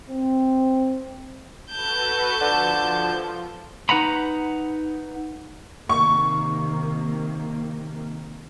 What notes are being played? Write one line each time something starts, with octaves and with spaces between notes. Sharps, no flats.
C4
F#4 A4 B4 A5 G6
D3 F3
D#4 B4 F#5 A#5 B5
C3 D#3 A#3 C#6